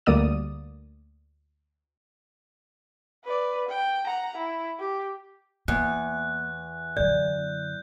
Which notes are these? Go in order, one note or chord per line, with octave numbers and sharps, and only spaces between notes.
D2 G3 A#3 D5 D#6 D#7
B4 D5
G5
F#5 A#5
E4
G4
E2 A#3 F#6
F#2 D3 D5 G6